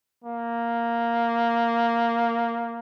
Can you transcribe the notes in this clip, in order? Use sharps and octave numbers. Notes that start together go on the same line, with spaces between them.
A#3